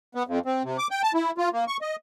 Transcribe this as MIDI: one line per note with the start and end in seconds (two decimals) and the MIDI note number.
0.15 0.23 59
0.27 0.39 41
0.46 0.63 60
0.64 0.77 48
0.78 0.87 86
0.91 1.02 79
1.03 1.12 81
1.14 1.31 64
1.38 1.49 65
1.53 1.65 58
1.68 1.77 85
1.82 1.96 75